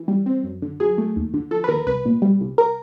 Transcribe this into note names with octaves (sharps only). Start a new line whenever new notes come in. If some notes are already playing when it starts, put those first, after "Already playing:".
Already playing: E3
G3
C4
F#2
D3
F#3 G#4
A3
D#2
D3
F3 A4
B4
D#2 A#4
C2 B4
A#2
G3
C2
A#4